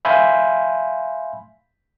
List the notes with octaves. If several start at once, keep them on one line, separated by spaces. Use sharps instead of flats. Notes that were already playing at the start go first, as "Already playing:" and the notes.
E5 F5 G#5 B5 C6 G6